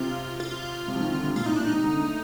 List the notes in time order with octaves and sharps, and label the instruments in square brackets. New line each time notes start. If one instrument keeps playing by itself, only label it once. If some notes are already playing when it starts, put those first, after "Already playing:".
Already playing: [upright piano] C3 [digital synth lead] F4
[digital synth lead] F4
[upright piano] C3
F3
D#3
D3
C3
[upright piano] A#2 [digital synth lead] F4
[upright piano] A2 [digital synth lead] D#4
[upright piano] A#2 [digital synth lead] D4
[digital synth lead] D#4
[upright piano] C3
D3
A3